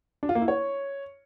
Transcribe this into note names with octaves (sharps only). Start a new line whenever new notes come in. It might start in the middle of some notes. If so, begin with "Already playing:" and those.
D4
F4
A#3
E4
C#5